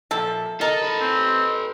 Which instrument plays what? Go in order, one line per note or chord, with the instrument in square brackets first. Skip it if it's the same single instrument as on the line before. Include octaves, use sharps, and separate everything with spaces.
[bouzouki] A#2 F3 E5 [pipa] A4
[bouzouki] D#4 [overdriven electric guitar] A4 [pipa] A#4 [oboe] A5
[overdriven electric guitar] A4 B4
[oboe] C4